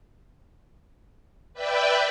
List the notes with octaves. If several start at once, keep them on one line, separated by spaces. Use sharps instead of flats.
B4 D5 E5 G5